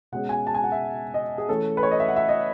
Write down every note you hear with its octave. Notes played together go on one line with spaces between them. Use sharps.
B2 G#3 C#4 F#5
G#5
A5
G#5
F#5
E5
D#5
G#4
E3 A3 C#4 A4
B4
C#5
D#5
E5
F#5
E5
D#5